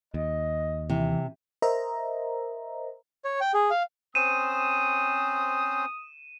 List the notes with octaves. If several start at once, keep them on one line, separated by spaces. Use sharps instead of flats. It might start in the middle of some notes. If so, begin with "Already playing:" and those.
D#2 D#5
C3 E3
A#4 C5 D#5 E5 A#5
C#5
G5
G#4
F5
C4 C#4 C5 D#6 D#7 E7